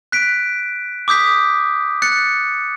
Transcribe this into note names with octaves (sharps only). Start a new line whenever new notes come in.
F#6 B6 D7
D6 D#6 G6 B6
F#6 A6 C#7